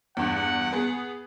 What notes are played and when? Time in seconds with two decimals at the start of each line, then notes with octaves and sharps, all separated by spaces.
0.17 E2 G2 F#5
0.73 B3 G#4